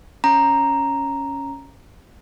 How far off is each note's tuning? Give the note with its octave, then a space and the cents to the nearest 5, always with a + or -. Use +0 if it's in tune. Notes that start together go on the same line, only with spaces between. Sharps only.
C#4 +0 A#5 +0